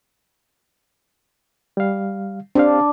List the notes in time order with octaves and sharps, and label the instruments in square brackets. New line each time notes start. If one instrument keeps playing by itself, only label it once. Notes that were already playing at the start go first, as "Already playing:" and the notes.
[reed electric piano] G3 F5
[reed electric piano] C4 G4 F5 [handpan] D4